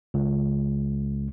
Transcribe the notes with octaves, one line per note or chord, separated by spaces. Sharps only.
C#2